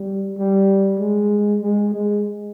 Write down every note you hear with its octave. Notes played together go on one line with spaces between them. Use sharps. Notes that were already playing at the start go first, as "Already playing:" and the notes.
Already playing: G3
G3
G#3
G#3
G#3